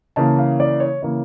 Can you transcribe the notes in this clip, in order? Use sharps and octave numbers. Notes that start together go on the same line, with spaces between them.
C#3 E3 A#3 A5
F5
D5
C#5
C#3 E3 A#3